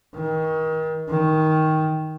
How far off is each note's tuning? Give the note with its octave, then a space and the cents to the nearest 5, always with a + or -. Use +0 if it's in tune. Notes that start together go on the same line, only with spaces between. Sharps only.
D#3 +30
D#3 +10